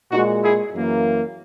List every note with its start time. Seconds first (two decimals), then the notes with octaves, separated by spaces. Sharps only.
0.11 A#2 D#4 F#4
0.16 G#3
0.43 E4 G#4
0.73 F#2 E3 A#3